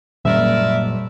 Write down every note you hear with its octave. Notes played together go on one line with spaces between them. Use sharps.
F#1 A#2 F#3 G3 A#4 D5 E5